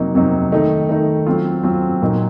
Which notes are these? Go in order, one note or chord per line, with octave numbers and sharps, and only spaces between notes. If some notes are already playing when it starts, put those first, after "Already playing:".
Already playing: F2 C3 F#3 A#3 D#4
F2 C3 F#3 A#3 D#4
D#3 A3 D#4
D#3 A3 D#4
F#3 C4 F4
F#3 C4 F4
A#2 F#3 A#3 D#4